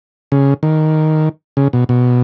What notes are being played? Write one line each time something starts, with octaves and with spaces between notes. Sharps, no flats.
C#3
D#3
C#3
B2
B2